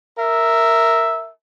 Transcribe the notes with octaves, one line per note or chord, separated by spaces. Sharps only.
A#4 E5